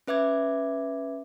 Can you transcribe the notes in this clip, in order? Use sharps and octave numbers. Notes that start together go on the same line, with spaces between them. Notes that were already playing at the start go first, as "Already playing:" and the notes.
C#4 B4 E5 D6 G#6